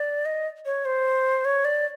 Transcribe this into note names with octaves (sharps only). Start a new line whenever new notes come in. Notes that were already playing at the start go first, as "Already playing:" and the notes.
Already playing: D5
D#5
C#5
C5
C#5
D5